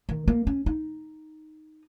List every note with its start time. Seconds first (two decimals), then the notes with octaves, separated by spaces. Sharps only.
0.09 D#3
0.28 A#3
0.47 C#4
0.66 D#4